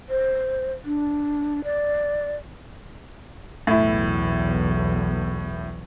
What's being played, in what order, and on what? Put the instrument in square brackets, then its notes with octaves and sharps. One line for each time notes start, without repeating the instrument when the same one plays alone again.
[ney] C5
D4
D5
[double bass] B1 E2 [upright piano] A2 E4